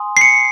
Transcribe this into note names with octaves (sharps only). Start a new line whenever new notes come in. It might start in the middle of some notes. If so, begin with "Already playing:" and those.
Already playing: G#5 C6 D#6
C7
C#7